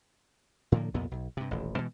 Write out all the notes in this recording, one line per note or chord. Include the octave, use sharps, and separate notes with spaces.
A2 D3 F3 A#3
C2 F2 A#2 B3
B1
G2 C3
D#1 A1
B2 E3 G#3